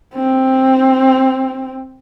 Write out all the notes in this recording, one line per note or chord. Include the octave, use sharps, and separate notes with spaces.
C4